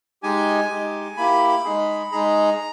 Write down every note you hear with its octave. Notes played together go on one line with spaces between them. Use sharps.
G#3 D#4 G4 G#5
G#3 D#4 G4
A#3 E4 G4 B5
G#3 D#4 G#4
G#3 D#4 G#4 A#5